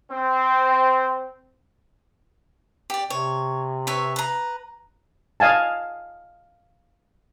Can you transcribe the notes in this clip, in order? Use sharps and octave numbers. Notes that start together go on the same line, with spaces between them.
C4
G4 D5
C3 C#5
B4 C#5 E5
B4 A#5
D#5 F5 G#5 A5